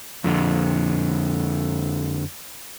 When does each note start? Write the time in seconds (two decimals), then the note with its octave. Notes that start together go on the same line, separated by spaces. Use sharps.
0.24 F2 D3